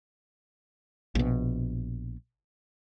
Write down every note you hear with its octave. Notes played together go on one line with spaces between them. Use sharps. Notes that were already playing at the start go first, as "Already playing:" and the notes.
A#1 B2